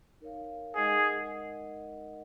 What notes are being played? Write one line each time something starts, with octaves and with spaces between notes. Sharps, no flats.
D#4 A#4 C#5 F5
G#3 D#4 G#4 A#4 D#5 F#5